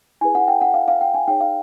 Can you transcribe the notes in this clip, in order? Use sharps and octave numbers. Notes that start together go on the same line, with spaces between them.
E4 G#4 B4 G#5
F#5
G5
F#5
F5
F5
G5
G#5
D#4 G#4 C#5 G5
F5